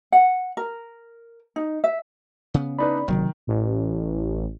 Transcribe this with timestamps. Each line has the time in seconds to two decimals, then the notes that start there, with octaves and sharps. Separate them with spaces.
0.12 F#5
0.57 A#4
1.56 D#4
1.84 E5
2.54 C#3 B3
2.79 D4 D#4 B4 D5 B5
3.08 F#1 C3 D#3 F#3
3.47 A1